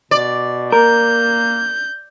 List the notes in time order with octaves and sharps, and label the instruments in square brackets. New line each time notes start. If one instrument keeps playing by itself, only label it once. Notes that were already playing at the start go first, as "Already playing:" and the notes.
[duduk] B2 [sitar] D5
[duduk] A#3 [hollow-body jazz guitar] A#4 [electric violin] G6